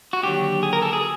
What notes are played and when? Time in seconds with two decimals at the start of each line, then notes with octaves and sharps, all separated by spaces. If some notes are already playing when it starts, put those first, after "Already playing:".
0.13 F#4
0.23 D#2 D3 F#3 G4
0.63 G#4
0.73 A#4
0.82 A4
0.93 G#4